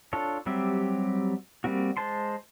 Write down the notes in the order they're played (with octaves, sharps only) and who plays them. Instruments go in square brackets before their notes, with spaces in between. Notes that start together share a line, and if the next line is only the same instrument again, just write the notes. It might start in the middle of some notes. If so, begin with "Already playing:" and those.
[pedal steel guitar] D4 F4 A4 C#5
F#3 G3 C4 G4 E5
G3 A#3 C4 F#4
G#3 C5 A5 C6